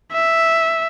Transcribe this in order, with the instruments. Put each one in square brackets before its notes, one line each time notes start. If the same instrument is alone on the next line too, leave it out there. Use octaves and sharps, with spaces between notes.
[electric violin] E5